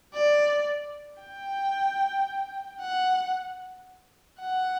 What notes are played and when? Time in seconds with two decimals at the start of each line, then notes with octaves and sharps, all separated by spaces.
0.14 D5
1.22 G5
2.81 F#5
4.40 F#5